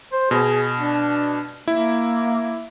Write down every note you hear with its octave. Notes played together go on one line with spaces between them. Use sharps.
C5
B2 G#4
D4
A#3 E4